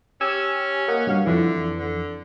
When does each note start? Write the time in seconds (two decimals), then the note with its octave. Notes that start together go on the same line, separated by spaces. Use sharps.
0.21 C#4 G4 G#5 E6
0.88 A#3 D#5 F#5
1.07 G2 F#4 F5
1.26 F2 D3 E3
1.79 D3